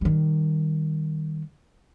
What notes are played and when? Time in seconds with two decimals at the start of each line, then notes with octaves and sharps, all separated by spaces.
0.01 D#3 G3